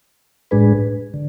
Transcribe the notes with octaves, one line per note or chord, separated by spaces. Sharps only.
A2 G#3 D4 G#4 B4
D3